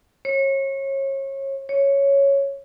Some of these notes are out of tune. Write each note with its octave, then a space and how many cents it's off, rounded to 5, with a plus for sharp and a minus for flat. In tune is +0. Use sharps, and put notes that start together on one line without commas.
C#5 -30
C#5 +0